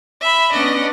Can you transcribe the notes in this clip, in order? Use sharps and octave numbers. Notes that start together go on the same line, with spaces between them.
E5 B5
B3 C#4 D4 D5 D#5